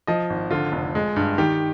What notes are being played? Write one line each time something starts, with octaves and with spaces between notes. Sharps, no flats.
F3 D#5
G#1
D3 F4
F1
G#3
G2
D#3 G4